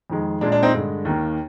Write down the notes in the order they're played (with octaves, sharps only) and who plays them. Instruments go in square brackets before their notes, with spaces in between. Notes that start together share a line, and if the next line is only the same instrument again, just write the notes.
[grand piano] F2 D#3 G#3
A#2 G#3 D4
D4
C4 D#4
G2 D3 G#3
D#2 D#3 A#3